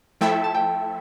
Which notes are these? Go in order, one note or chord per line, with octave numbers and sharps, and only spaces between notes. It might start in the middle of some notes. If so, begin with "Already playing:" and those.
F3 A3 E4 A4 E5 G5
A5
G5